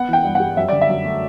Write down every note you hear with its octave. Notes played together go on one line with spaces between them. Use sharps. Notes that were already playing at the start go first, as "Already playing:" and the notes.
Already playing: B3 F#5
E3 G5
G2
G3 F#5
F#2 E5
D3 D5
E5
F#2
A3